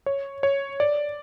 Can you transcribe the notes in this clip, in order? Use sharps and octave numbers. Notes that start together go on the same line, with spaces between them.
C#5
C#5
D5